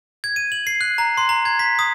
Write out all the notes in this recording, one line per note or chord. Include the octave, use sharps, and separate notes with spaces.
G#6
D#7
F#7
C7
F#6
A#5
C6
A#5
G#6
B6
D#6